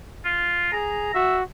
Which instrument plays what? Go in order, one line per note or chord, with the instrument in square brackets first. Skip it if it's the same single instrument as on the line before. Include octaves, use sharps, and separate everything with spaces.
[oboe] F4
[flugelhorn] G#4 [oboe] A#5
[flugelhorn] F#4 [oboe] E5